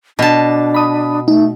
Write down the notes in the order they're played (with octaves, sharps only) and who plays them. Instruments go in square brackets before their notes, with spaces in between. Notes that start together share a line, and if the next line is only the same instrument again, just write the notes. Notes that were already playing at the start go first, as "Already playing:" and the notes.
[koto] B2 A5 [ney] D4
[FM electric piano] B5 D#6
[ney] A3 [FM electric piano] D#4